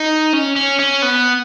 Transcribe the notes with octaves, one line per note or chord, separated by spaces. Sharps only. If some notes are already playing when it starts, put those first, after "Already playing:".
Already playing: D#4
C#4
C#4
C#4
B3